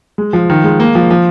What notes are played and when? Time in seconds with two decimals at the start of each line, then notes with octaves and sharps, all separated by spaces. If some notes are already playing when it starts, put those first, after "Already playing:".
0.18 G#3
0.33 F3
0.50 D#3
0.64 G#3
0.80 A#3
0.95 F3
1.11 F3